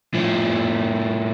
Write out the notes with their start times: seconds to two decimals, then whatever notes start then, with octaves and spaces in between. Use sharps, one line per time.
0.14 A2 F3